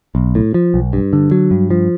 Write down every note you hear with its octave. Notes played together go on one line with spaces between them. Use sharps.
B1
A2
F3
B1
G2
D3
F#3
G2
F3